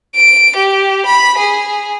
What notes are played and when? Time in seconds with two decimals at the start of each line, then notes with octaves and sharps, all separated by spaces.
0.15 D7
0.56 G4
1.06 B5
1.38 G#4